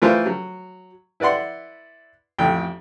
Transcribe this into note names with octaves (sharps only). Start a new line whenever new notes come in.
E3 A3 F4 A#4 C5
F#3
E4 B4 D5 F#5 C6
A1 F2 G5